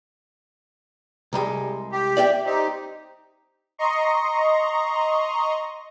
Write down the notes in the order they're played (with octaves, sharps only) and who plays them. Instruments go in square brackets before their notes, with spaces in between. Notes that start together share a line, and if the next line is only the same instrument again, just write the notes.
[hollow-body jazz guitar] C2 G3 G#3
[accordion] G4
[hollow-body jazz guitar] D5 E5 G5
[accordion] C4 D#4 G4
[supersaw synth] D#5 A#5 C6 C#6